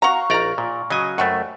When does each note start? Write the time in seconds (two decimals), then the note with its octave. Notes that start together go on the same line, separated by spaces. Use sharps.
0.02 F#4 F5 A#5 C#6
0.30 A#1 D#4 A#4 D5 A#5
0.58 A#2
0.90 C#3 F#3 D#5 G#5
1.18 F#2 G3 A3 C4 F#4